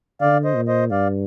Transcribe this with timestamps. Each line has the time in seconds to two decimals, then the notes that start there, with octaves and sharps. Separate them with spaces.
0.21 D3 D5 F5
0.44 C5 D#5
0.56 A#2
0.68 C5 D#5
0.91 G2 D5 F5